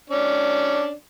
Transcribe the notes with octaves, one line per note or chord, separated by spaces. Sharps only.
C#4 D4 D5